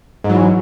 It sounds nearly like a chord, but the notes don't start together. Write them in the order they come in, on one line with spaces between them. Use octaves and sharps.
G#2 F#3 E3